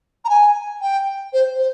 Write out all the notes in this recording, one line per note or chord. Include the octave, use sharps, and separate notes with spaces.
A#5
G#5
G5
C5
C5